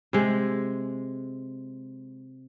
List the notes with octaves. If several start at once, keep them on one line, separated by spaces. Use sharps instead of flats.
C3 G#3